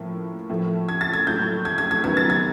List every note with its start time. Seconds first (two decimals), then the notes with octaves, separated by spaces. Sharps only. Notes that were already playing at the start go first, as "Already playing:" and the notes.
Already playing: A2 F3 A#3
0.50 A2 F3 A3
0.89 G#6
1.01 A6
1.13 G#6
1.27 A2 F#3 A3 G6
1.65 G#6
1.78 G#6
1.91 G#6
2.04 F#2 D#3 F#3 B3 G#6
2.17 A6
2.30 G#6